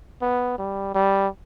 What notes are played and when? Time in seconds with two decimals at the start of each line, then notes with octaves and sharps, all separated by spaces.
0.22 B3
0.58 G3
0.95 G3